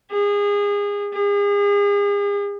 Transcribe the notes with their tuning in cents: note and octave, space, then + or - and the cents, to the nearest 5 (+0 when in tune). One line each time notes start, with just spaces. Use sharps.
G#4 -30
G#4 -40